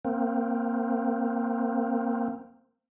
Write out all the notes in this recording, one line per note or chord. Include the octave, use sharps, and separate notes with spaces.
A#3 C4